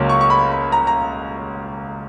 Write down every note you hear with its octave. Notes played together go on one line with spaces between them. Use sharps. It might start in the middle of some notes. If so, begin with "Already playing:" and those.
Already playing: C#2 C#3 F#3 A#3 C#4
C#6
C#6
B5
B5
A#5
A#5